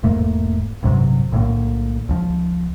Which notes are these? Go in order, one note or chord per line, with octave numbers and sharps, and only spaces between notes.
E1 G#2 A3 A#3
A1 G2 C3 F#3
B1 A2 D3 A#3
C#2 F3